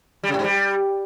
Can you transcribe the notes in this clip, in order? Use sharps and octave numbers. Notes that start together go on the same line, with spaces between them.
G3
C#3
A2
G#2
G3